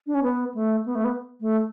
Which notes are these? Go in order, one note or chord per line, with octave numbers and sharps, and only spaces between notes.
D4
C#4
B3
A3
B3
A3
B3
A3